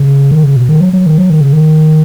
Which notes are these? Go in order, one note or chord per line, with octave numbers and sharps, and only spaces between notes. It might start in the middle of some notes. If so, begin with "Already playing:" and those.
Already playing: C#3
D#3
C#3
B2
D#3
F#3
F#3
D#3
F#3
D#3
C#3
D#3